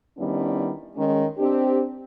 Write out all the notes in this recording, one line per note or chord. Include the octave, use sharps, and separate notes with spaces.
D#3 G3 B3 C#4 D4 E4
D#3 G#3 C#4
C4 D4 G4